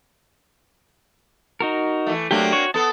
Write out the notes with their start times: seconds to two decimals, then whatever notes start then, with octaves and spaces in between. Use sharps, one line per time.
1.60 D#4 F#4 A#4
2.07 E3 A3
2.31 F#3 A3 A#3 C4 D4 G4
2.52 F#4 C#5
2.74 B3 A4 A5